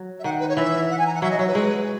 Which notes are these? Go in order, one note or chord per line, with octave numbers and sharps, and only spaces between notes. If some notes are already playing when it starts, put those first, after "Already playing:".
Already playing: F#3
E5
D#3 F#5
B4
C#5
E3 E5
F#5
G#5
A#5
F#5
F#3 E5
D#5
F#3 C#5
B4
G#3